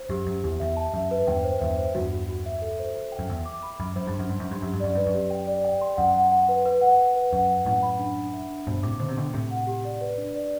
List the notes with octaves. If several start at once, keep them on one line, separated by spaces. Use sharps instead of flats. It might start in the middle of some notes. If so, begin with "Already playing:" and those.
Already playing: C5
F#2 G4
F#2 G4
E2 G4
E2 E5
A5
F#2 E5
B4
E2 G2 G5
C5
E2 G2 E5
C5
E2 G2 F#4
F#4
F#4
E5
A4
C5
C5
G5
F#2
E2 E5
D6
B5
F#2 B5
F#2 C5
G2
C6
F#2
G2 C6
F#2
C6
G2
F#2 G4
G2
F#2 D5
G2 B4
F#2
G4
G5
D5
G5
C6
F#2 F#5
F#5
F#5
B4
B4
F#5
F#5
B4
F#2 F#5
F#5
F#2 A2 F#5
B5
D4
D4
E5
D4
G2 B2 C5
A2 C3 D6
B2 D3 C5
C3
B2 D3 G5
A2 C3 G4
F#5
G4
D5
B4
D4
D5